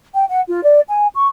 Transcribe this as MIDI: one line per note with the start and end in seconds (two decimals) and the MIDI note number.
0.14 0.26 79
0.29 0.41 78
0.48 0.62 65
0.64 0.81 74
0.88 1.07 80
1.14 1.28 85